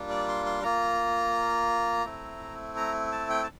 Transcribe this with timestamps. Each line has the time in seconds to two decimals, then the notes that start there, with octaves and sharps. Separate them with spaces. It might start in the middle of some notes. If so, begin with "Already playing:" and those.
Already playing: G3 A#3 D4 F4
0.10 D5
0.28 C6
0.46 C6
0.63 A#3 F4 A#5
2.05 A3 C4 E4
2.77 A#5
3.12 A5
3.30 G5
3.44 A5